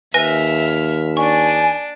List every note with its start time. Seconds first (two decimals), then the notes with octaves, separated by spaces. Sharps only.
0.14 D#2 B4 E5 G#5 F6 A#6
1.17 D4 G#5 C#6